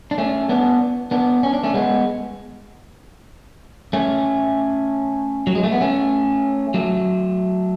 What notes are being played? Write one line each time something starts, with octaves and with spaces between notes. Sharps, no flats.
D4
A3 C#4
B3 D4
B3 D4
C#4
D4
A3 C#4
G#3 B3
A3 C#4
F#3
G#3
A3
B3
A3 C#4
F#3 A3